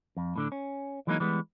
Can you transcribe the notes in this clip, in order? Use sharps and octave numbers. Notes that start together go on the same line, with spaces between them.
F2
A2 D3 D4
C#4
E3 F#3 G#3 A#3 D4 D#4
E3 G3 G#3 B3